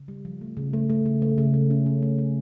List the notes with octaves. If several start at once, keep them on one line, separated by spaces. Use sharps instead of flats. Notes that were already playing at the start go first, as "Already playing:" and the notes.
Already playing: C#3
G3
F3
A3
C#3
A3
A3
C#3
A3
C#3
A3
C#4
C#4
A3
A3